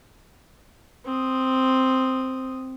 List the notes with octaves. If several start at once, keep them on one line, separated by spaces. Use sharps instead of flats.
C4 D#6